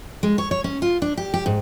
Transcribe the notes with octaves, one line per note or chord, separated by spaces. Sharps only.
G#3
C#5
C#5
C#4
F4
D4
G4
G4
G#2